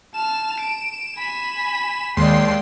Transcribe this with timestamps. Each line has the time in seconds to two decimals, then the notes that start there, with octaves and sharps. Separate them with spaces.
0.14 A5 F6 E7
0.60 D7
1.16 G#5 B5
2.17 D#2 G#3 D5 G5 C6 C7